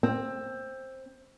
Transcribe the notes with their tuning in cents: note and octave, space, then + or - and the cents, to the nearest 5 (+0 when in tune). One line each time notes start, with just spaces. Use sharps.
C4 +15